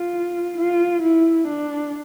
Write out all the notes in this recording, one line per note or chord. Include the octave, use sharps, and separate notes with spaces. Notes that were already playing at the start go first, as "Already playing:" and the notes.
Already playing: F4
F4
E4
D4